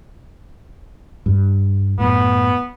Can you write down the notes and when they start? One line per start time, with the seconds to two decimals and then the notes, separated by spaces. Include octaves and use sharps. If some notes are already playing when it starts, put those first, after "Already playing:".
1.26 G2
1.99 F#2 A2 B3